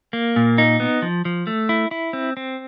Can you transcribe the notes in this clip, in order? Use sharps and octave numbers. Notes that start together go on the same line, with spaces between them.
A#3
A#2
D#4
B3
F3
F3
A3
E4
E4
C4
C4